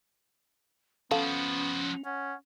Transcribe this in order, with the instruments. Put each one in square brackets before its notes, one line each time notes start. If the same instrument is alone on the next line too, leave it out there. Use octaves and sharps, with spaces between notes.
[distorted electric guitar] F3 F#4 [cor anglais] B3 [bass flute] C#4 [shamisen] A4 F5
[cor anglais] C#4 [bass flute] F#5